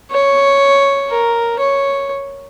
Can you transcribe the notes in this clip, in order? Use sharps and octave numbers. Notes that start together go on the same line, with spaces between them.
C#5
A#4
C#5